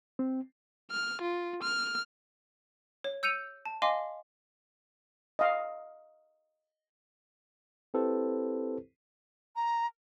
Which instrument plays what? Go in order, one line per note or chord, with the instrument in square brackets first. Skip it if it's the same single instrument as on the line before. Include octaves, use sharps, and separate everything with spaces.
[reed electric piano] C4
[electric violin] F6
F4
F6
[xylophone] C#5
E6 G6 C#7 D#7 F7
A5
D#5 F5 G#5 C6 D6
[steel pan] D#5 F5
[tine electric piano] C4 E4 G4 A4 B4 C5
[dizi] A#5